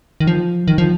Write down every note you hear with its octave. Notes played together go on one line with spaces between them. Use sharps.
D#3
F3
D#3
F3